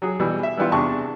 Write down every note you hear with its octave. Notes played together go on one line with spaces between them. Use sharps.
F#3 G#4
B2 E3 G3
E5
E3 G3 B3 E4 F4
E2 C3 D4 A5 C#6